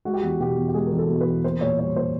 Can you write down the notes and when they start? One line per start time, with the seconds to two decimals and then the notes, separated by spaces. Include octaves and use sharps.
0.05 G#3 F#4
0.14 G4
0.22 E2 F#4
0.40 B2 G4
0.57 E2
0.68 G4
0.74 G#3 G#4
0.86 A#4
0.92 E2
0.98 A4
1.09 B2
1.21 B4
1.26 E2
1.44 A#3 C5
1.61 A#2 C#5
1.78 G3 C#5
1.96 A#2 C5